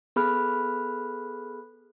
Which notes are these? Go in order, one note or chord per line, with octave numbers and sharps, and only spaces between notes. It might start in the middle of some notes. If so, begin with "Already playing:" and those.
B3 G#4 A4 B5 F6 F#6